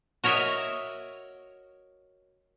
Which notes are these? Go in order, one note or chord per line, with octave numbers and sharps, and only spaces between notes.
F#4 A#4 C#5 D#5 E5